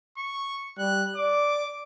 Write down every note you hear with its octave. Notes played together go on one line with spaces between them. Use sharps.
C#6
G3 F#6
D5 D6